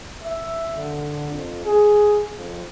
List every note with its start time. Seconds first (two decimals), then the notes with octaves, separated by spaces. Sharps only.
0.23 E5
0.77 D3
1.31 F2
1.65 G#4
2.36 F2